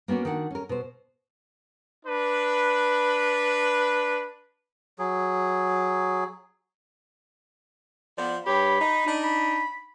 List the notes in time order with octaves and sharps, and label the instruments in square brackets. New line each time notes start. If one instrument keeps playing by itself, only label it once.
[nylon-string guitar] A#3 B3 C#4 F#4 D5
D#3 D4 F#4 F#5
C#4 A#4
B2 C5
[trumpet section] D4 B4
[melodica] F#3 G#4
[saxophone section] F3 B3 D5
[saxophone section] G2 G4 C#5 [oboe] B5
[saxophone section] D#4
D4 D#4
[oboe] B5